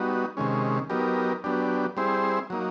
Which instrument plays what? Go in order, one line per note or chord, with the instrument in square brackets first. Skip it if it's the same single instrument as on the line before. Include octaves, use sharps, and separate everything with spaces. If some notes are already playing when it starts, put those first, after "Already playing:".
Already playing: [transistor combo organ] G3 B3 D#4 F#4
C3 D#3 G#3 C#4
F#3 B3 D#4 G4 A#4
F#3 B3 D4 G4
G3 C4 E4 G#4 C5
F#3 A#3 D#4